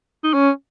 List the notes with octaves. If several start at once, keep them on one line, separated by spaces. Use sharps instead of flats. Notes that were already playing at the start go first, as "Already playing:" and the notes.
D#4
C#4